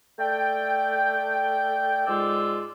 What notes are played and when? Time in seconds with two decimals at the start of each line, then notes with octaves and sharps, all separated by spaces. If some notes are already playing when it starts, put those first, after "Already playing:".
0.19 A3 D5 G5
2.07 G#2 G#3 F4 D5 E6